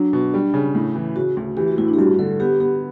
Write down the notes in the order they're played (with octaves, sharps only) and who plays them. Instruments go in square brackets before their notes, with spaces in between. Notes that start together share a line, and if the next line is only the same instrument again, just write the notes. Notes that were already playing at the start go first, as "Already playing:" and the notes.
Already playing: [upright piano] F#3 [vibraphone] D4
[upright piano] B2
G3
C#3
A2
E3
[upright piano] C#3 [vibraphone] F#4
[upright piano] D2
[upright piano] E3 [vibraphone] G4
[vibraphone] F#4
[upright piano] A2 [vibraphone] E4
[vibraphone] D4
G4
[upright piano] G2 [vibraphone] F#4
[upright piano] D3 [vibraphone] A4
[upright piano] B3 [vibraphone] G4
[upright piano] B3 [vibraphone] G4